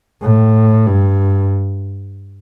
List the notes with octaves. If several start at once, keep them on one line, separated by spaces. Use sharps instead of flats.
A2
G2